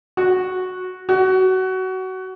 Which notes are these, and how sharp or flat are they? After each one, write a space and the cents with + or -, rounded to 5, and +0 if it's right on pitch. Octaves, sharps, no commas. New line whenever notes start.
F#4 -5
F#4 +20